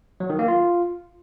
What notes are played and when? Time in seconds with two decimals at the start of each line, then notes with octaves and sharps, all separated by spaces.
0.20 F#3
0.30 D#3
0.39 A#3
0.48 F4